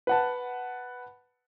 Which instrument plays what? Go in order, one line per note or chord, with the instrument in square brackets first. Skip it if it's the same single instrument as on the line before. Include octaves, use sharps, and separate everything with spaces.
[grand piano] B4 F#5 A5